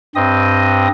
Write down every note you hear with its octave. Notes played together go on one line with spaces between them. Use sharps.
G2 C4 D#5 D#6